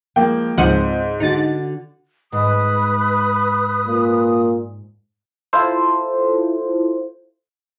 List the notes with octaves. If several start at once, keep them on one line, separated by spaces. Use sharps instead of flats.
F3 G#3 A#3 G5
C#2 G#2 F3 C4 C5 F#5 D#7
D3 D#4 F#4 A6
G#2 B4 D#6
A#2
E4 F4 A4 C5